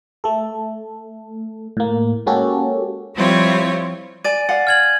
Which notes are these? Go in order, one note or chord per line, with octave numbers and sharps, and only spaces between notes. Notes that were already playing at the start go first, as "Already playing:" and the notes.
A3 A4
A2 A#3
G#3 A#3 C#4 F#4 G4 A4
F3 G3 C4 E4 F4 C#5
D5 G#5 A6 D#7
D5 F5 F#5
F6 G#6 F#7